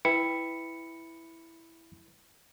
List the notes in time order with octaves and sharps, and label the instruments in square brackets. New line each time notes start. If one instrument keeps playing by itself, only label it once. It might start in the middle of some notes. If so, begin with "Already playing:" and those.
[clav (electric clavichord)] E4 [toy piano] B4 G5 [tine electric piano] C#7